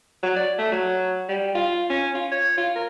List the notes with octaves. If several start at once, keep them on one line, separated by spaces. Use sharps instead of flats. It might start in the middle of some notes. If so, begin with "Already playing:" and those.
F#3
D5
A3
F#3
G3
F4
C#4
F4
C#5
F4
A#4